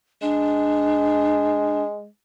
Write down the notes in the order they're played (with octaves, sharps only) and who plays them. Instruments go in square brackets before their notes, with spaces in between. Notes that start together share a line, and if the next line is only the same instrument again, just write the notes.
[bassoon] G#3 [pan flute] D4